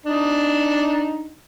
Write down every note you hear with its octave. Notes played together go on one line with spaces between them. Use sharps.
D4 D#4